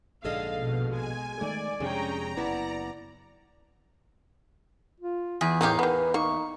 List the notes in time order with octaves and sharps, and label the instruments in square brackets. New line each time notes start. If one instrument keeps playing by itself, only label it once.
[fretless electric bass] A#1 G#2 D3 [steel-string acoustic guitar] G#4 A4 D#5 [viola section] F5
[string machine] B2
[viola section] G#3 [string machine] G#5
[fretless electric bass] D#3 A3 [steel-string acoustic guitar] G#3 [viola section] D5
[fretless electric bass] F2 C3 D4 [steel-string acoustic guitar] G#3 [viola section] C#4 G#4 G5 [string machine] A#5
[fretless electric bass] F#1 D#2 B3 [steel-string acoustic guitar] E4 F#5 A5 [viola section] D5
[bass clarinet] F4
[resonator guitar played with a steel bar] E2 [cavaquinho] G#4
[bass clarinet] A2 [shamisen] D#3 G4 [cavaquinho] D#4 G#4 F5
[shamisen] D#3 B3 [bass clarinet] B4
[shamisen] A#3 [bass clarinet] D#4 [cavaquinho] C#6